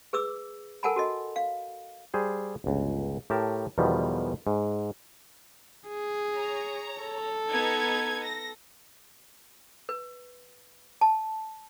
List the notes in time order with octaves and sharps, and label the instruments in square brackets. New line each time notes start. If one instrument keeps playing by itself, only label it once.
[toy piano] G#4 B4 D6 E6
A4 A#4 F#5 G#5 A5 B5
F#4 A4 D#5
F5
[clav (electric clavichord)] G3 G#4 C5
G1 C#2
A2 G4 A#4 A5
E2 B2 D#3 F3 G3
G#2
[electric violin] G#4
[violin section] C#5 A#5
[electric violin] A4
[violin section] B3 D#4 G#6
A#6
[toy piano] B4
A5